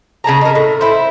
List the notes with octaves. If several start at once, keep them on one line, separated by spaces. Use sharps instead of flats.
C#3 G#4 A5 A#5
D#4 A#4
A2
E4 C5